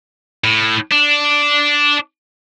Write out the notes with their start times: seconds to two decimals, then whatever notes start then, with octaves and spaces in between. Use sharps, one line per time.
0.44 A2
0.91 D4